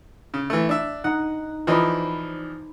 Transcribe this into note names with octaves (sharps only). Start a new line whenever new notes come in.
C#3
E3 A3
D4 E5
D#4 F#5 A#5
E3 F3 D#4 C5 D5 B5